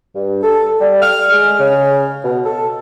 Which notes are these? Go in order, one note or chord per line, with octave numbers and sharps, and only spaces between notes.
G2
A4
G3
F6
G#3
C#3
B2
A4